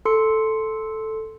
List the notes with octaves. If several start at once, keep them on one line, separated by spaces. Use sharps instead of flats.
A4 C6 C#7